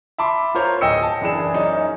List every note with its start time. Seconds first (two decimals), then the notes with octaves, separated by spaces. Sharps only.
0.18 E5 A5 B5 C6 D6
0.55 F4 A#4 C5 C#5
0.81 D1 D#5 G5 G#5 E6 C#7
1.03 A5
1.21 F#1 E3 D4 G#4 E7
1.54 F#2 C#4 D#4